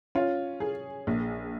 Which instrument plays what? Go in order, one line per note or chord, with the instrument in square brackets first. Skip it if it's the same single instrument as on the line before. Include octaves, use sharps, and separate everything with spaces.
[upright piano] C#4 [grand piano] F4
[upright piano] G#4
A#1